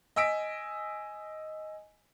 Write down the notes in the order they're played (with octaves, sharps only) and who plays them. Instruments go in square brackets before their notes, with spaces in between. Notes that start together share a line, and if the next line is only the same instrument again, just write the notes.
[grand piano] D#5 G#5 E6 B6 D7